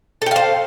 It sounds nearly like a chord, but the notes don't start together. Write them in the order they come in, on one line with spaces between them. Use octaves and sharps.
A4 G5 F5 C5